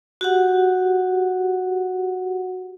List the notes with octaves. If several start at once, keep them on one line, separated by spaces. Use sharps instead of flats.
F#4 G4 F#5